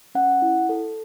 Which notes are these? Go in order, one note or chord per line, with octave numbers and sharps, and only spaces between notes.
C#4 F#5
E4
A4